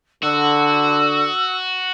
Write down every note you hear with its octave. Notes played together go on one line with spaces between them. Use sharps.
D3 F#4 E6